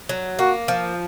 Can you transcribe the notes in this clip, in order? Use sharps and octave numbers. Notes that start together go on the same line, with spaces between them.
F#3
A#3 F#4
F3